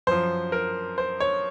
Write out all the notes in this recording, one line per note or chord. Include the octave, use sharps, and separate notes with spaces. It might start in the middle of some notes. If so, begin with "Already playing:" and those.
F#2 F3 C5
A#4
C5
C#5